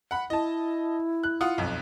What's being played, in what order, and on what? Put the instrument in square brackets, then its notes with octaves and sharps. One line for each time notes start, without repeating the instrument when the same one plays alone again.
[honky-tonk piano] F#5 B5
[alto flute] E4 [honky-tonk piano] D#5 A5
[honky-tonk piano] F#6
F4 F#5 D#6
B1 F2